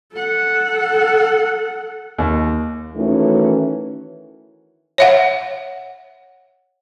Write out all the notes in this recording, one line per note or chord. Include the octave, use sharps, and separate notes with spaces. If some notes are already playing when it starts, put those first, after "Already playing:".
A4 F#5
D#2
D#3 E3 A3 C#4 F#4
C#5 E5 F#5